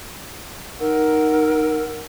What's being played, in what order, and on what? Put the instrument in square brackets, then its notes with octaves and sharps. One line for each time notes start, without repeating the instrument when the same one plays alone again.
[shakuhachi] D#4 [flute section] A#4 F#5 E6